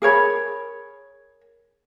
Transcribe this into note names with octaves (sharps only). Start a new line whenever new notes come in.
G#4 A#4 C#5 B5